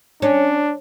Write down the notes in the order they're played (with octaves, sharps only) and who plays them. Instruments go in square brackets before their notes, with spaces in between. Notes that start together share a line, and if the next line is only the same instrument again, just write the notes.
[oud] C#4 [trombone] D4